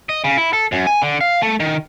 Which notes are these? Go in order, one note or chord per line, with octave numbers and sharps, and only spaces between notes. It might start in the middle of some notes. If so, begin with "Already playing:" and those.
D#5
C#3
E4
A4
F#2
G#5
D3
F5
A3
D#3